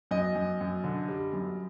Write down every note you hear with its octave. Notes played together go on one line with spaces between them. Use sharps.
F#2 D#5
F#2
F#2
D3
G3
F#2